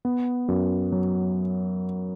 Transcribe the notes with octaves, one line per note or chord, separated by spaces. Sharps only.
B3
F#2
F#3